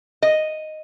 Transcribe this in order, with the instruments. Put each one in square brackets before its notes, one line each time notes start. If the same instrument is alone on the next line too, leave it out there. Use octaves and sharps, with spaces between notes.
[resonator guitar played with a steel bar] D#5